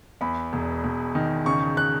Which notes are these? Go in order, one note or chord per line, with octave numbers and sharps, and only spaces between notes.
E2 B5
E1
E1
D#3
C#3 C#6
F#6